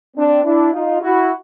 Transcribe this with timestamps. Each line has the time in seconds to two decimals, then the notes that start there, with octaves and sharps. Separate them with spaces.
0.16 C4 D4
0.44 D4 E4
0.73 D#4 F4
1.01 E4 F#4